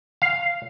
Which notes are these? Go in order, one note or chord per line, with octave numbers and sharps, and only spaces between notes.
F5